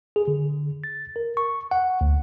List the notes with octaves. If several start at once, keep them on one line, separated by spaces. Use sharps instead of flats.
G#4
D3
A6
A#4
C#6
F#5
D2